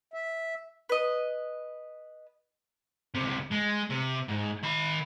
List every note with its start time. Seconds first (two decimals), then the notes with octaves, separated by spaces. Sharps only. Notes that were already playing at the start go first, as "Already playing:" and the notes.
0.14 E5
0.89 B4 D#5
3.15 C#2 C3
3.51 G#3
3.90 C3
4.28 G#2
4.63 D#3 B5